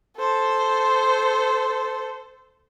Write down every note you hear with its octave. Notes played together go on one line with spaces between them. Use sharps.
A4 C5